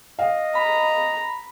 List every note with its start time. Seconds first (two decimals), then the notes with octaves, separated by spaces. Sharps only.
0.19 D#5 F5
0.55 A#5 B5